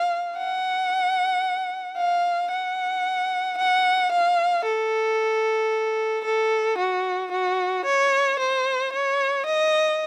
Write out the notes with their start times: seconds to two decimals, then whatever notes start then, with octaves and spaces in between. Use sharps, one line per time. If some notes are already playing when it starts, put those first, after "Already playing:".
Already playing: F5
0.37 F#5
1.97 F5
2.51 F#5
3.58 F#5
4.12 F5
4.65 A4
6.25 A4
6.78 F#4
7.32 F#4
7.85 C#5
8.39 C5
8.93 C#5
9.46 D#5